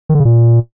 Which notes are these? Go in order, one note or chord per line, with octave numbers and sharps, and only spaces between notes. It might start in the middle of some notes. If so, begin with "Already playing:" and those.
D#3
D3
C#3
A#2